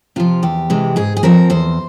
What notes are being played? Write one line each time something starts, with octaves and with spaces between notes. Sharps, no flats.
C3 F3 F4
E2 G4
C3 E3 G#3
G#2 G#4
G#4
F3 C4 A#4
E2 C5